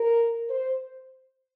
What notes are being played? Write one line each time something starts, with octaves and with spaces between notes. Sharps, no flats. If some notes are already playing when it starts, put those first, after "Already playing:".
Already playing: A#4
C5